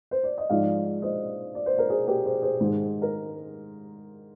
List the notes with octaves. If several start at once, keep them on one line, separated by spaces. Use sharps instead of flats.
C5
D5
D#5
G#2 F3 G#3 D5 F5
C5 D#5
D5
C5
A#4
G#4 C5
G4 A#4
G#4 C5
G#4 C5
G#2 D#3 G#3
A#4